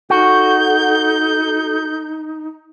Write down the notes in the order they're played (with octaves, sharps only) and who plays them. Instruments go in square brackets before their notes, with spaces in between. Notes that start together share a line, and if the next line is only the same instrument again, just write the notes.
[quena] D#4 [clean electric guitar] F#4 [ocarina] A4 [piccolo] G6